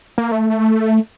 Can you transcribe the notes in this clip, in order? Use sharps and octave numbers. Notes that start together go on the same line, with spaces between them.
A#3
A3